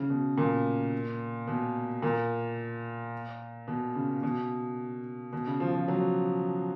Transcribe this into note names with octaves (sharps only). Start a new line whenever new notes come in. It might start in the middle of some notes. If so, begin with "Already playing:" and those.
Already playing: C#3
B2
A#2
B2
A#2
B2
C#3
B2
B2
C#3
F3
F3
F#3